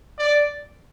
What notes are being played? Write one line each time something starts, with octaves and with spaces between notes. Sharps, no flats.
D5